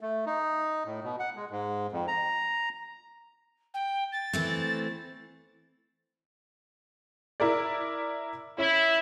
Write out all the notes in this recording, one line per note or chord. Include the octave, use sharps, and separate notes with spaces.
A3
D#4
A2
B2
F#5
G#3
G#2
F2
A#5
G5
A6
E3 A3 C4
E4 A#4 D5
C#4 E4